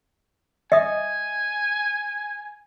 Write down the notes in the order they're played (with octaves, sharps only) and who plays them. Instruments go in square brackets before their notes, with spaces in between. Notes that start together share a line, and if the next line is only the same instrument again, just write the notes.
[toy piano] D#5 E5 D#6 [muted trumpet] G#5